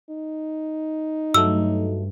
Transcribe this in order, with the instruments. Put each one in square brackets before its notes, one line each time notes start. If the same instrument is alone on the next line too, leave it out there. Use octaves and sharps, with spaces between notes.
[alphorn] D#4
[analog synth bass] G2 [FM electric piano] F#3 A3 [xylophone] E6